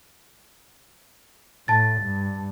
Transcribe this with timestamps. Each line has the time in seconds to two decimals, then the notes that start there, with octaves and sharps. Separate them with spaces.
1.68 A2 A5 A6
2.01 G2